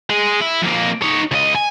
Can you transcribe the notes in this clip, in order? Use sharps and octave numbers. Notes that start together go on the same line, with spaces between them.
G#3 G#4
E4
F2 A#3
D#4 C#5
C#2 D#5
G#5